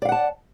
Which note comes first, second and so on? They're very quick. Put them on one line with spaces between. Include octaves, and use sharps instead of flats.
D5 F5 F#5 A5